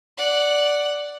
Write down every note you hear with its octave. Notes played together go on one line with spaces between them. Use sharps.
D5 F#5